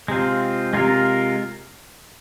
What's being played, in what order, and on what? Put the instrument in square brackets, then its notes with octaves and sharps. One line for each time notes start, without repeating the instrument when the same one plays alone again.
[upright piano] C3 [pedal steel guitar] G#3 C4 F4
[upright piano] C3 [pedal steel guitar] G#3 F4 A#4